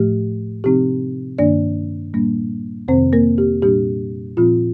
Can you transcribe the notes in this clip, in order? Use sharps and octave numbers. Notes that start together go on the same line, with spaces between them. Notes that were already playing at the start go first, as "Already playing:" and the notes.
Already playing: A2 F3 A3 G4
C3 F3 C4 D#4 G4
G2 D#3 A#3 D4 D5
A#2 G3 A#3 D4
F2 C3 D#3 C4 C5
A#3 A#4
G4
A#2 G3 D4 G4
A#2 F3 C4 F4